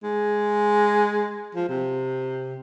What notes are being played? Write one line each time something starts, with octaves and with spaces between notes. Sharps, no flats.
G#3
F3
C3